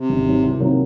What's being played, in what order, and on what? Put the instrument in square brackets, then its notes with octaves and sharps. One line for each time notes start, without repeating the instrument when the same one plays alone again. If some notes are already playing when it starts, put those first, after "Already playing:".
Already playing: [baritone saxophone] C3
[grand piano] G#1
G#2 F#3
C2
C3 D#3 F#3 A#3